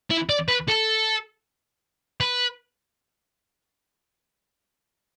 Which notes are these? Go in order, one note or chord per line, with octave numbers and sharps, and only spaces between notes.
E4
D5
B4
A4
B4